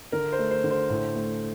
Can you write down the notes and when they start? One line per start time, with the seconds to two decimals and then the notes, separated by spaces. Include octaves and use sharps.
0.12 D3 A#4
0.32 C5
0.39 A3
0.51 C5
0.64 D3
0.70 C5
0.90 A2
1.15 A3